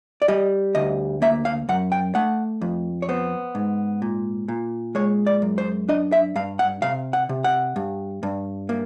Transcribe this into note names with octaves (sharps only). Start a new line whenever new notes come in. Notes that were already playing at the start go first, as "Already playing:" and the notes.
D5
G3 D#5
D2 D#5
A#3 E5
F5
F#2 F#5
G5
A3 F#5
F2
C#5
B3 C5
G#2
A#2
A#2
G#3 C#5
D5
F#2
C5
D4 D#5
E5
G2 F5
F#5
C3 F5
F#5
C3
F#5
G2
G2
A#3